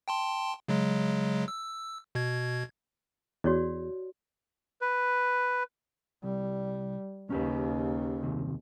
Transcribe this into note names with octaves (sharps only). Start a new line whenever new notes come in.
G5 A5 C6
C#3 F#3 G#3
E6
B2 G#6
E2 F#4 C#5 D5
B4
C2 G3
D#2 C#3 C#4 G4 B4
F#2 C3 D#3